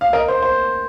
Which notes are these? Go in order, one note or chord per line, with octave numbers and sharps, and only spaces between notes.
F5
A#4 D#5
C5
C5